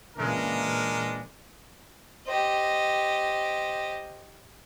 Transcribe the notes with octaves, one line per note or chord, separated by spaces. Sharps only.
A#2 C#3 E3 G#3 D4 A#4
G4 C5 D#5